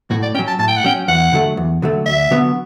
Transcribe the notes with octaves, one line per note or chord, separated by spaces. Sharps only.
A2 F#4
D5
F#3 C#4 G5
A5
A2 A5
G5
F#5
F#3 C#4 G5
E2 F#5
D3 F#3 A3
E2
D3 F#3 A3
D2 E5
D3 F#3 B3